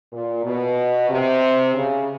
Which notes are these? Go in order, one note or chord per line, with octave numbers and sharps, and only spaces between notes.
A#2
B2
C3
C#3